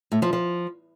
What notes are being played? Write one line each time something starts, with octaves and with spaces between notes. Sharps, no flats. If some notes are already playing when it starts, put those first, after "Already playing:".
A2
F3
F3